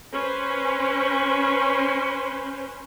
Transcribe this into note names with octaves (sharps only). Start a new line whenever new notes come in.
C#4 B4 C5